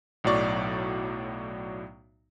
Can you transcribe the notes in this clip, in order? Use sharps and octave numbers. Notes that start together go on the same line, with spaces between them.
B1 A2 F#3 D5 C#6